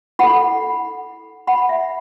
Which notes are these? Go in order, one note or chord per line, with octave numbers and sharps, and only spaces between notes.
E4 A4 F#5 B5
F#5 B5
E5